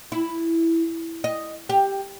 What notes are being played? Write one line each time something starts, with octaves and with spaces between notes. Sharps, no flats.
E4
D#5
G4